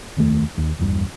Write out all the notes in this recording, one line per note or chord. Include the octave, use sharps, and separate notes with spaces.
F1 D#2 A3
D#2
A#1 E2 G2